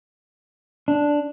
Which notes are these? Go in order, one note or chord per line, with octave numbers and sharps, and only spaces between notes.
D4